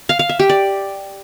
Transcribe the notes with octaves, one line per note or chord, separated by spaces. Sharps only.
F5
F5
E5
G4
D5